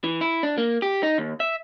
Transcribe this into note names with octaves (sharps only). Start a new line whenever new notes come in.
E3
E4
D4
A#3
G4
D#4
D#2
E5